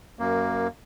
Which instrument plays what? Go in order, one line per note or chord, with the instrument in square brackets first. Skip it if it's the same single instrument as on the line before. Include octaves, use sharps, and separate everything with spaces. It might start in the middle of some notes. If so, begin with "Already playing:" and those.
[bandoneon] F#2 A#3